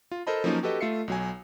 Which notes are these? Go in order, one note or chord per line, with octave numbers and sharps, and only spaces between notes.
F4
A4 A#4 C5 D#5 A5 B5
F3 F#3 A#3 C#4 D#4
F#4 G4 A4 B4 D#5
A3 F4 E5 C7 C#7
B1 F#3 G#5